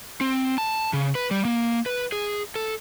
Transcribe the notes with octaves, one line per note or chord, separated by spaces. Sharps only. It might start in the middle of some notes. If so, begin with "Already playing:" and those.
C4
A5
C#3
B4
G3
A#3
B4
G#4
A4